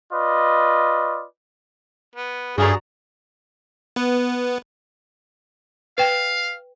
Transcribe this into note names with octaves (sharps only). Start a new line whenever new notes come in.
F4 B4 D5 D#5
B3
G2 C#3 A3 F#4 G#4 A#4 D5 A#5
B3 B4
B4 F5 G5